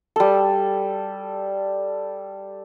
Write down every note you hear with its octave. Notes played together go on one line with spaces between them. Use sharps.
G3 A4